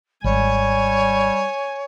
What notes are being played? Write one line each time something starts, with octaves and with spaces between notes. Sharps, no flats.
G#1 G3 C#5 G#5